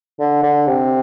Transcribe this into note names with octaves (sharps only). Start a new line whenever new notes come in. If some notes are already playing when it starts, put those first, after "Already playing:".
D3
D3
C3